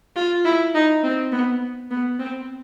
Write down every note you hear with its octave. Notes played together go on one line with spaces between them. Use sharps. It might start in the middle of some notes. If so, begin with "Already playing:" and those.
F4
E4
D#4
C4
B3
B3
C4